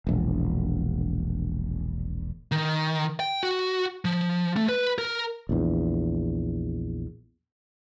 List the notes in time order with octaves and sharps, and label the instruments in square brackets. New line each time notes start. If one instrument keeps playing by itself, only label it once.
[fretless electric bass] E1 A#1
[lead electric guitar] D#3
G5
F#4
F3
A3
B4
A#4
[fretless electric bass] A#1 E2